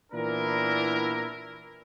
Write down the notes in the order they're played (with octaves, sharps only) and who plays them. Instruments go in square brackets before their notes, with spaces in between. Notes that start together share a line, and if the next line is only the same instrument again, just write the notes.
[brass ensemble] A#2 E3 B3 D4 E4 A#4